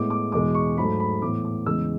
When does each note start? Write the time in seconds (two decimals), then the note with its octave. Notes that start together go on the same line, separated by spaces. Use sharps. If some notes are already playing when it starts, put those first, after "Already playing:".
Already playing: A2 G#3 B3 D6
0.10 D6
0.32 E2 B2 G#3 D6
0.55 C#6
0.77 G#2 F#3 A3 B5
1.00 B5
1.22 A2 E3 B3 D6
1.45 D6
1.66 E2 C#3 G#3 B3 E6